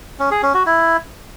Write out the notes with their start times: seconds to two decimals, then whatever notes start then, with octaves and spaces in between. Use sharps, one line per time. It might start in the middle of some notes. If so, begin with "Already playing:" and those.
0.19 C#4
0.31 G#4
0.43 C#4
0.54 F#4
0.66 E4